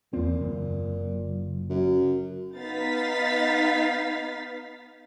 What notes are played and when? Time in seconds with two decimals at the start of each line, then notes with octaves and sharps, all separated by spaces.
0.13 E2 A#2 C4
0.41 F#1
1.70 F#2
2.57 B3 D#4 F5 A6 B6